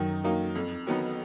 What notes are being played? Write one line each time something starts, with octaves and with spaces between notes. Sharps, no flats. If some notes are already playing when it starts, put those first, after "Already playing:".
Already playing: F#2 D#3 F#3 D#4
F#3 A#3 D#4
F2
D#3 F#3 B3 D#4